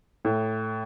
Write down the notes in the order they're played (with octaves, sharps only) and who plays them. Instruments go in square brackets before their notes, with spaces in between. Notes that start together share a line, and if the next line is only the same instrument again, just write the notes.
[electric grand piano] A2